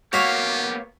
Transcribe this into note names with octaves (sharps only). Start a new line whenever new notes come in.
A#3 B3 F#4 G4 C#5 E5 F5 G#5